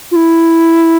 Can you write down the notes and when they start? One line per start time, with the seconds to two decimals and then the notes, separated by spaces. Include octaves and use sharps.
0.11 F4
0.16 E4